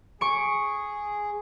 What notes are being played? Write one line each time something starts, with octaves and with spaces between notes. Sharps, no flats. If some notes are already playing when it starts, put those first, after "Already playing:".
G#4 C#6 D7